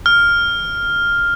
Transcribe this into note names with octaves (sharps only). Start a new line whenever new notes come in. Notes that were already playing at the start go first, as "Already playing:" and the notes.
F6